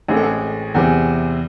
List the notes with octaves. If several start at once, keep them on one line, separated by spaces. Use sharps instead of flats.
A1 A2 G#3 C4 G#4
A4
G#4
E2 C3 E3 C4 G#4